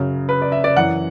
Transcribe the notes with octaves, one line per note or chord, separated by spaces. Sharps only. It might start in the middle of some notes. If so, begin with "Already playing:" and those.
Already playing: F#2 C#3 F#3
B4
D5
E5
D5
F#2 E3 F#5